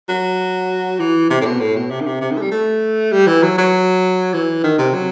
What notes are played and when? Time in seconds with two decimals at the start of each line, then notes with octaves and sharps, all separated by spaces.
0.09 F#3
1.00 E3
1.30 C3
1.41 A2
1.45 B2
1.60 A2
1.76 B2
1.90 C3
2.01 D#3
2.07 C3
2.21 C3
2.31 D#3
2.38 A3
2.42 G3
2.51 A3
3.12 G3
3.27 E3
3.43 F#3
3.58 F#3
4.34 E3
4.64 D#3
4.79 C3
4.94 F#3